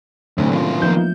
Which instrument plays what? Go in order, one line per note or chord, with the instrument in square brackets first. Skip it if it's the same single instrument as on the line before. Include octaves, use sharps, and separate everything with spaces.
[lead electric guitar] D2 [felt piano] A2 C3 C#4 [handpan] F#3 A3 D4
[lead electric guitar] D#2 F4
[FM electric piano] F3 G6 [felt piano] A#3 B3 D#4